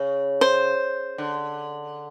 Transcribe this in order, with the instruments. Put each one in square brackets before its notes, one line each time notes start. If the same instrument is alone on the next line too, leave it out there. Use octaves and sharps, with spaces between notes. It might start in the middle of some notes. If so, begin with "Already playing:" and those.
Already playing: [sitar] C#3
[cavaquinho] C5
[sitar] D3